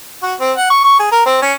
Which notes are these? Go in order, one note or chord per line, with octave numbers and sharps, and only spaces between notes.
F#4
C4
F#5
C#6
C#6
G#4
A#4
C4
C#4